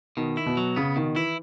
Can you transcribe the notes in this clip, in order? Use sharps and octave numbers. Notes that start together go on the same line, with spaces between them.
B2 D#3
E4
B2
F#3
C#3 B3
B2 D#3
E3 E4